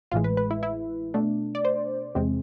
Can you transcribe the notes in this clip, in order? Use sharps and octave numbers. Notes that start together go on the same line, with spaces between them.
A1 A2 E3 G#3 F4
B4
B4
E4
E4
B2 A3 D4
D5
C5
E2 C3 G#3 C4